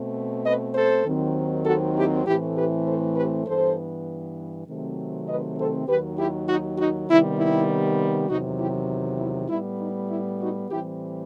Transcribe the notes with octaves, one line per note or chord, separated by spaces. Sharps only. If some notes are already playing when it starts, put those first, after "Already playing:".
Already playing: B2 A3 C4
B4 D#5
A4 C5
D#2 D#3 F#3 C4
F#4 A4
E4 G4
A2 E3 A3 C4 E4 G4
G4 B4
A4 C5
G4 B4
G2 E3 B3 A4 C5
C3 D#3 F#3 A3 C4
B4 D#5
A4 C5
D#2 D#3 F#3 G4 B4
E4 G4
D#4 F#4
D#4 F#4
C3 D#3 G3 B3 E4
E4
E2 C3 D#3 F#3 D#4 F#4
E4 G4
E4
A2 G3 B3 E4
D#4
E4
D#4 F#4
A2 E3 G3 C4 E4 G4